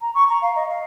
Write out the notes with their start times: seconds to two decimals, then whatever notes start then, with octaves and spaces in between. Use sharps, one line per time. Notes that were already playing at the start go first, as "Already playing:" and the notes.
0.01 A#5
0.15 C#6
0.29 A#5
0.42 F5
0.56 D#5
0.70 F5